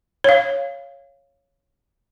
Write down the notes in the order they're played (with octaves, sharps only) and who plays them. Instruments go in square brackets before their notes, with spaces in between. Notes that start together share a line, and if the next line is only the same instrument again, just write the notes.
[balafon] C#5 F5